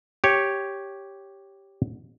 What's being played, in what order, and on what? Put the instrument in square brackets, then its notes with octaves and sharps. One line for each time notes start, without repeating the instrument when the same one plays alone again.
[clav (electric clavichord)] G4 C#5